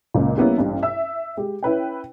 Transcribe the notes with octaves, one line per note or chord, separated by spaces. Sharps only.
F#1 C#2 A#2
G3 A#3 B3 C#4 E4
A1 G2
E5 E6
G#3 G4
C#4 E4 B4 G5